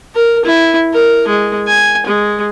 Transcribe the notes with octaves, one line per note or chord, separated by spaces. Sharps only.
A#4
E4
A#4
G#3
G#5
G#3